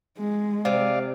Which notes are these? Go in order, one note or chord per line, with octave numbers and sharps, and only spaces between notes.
G#3
C3 D5 F5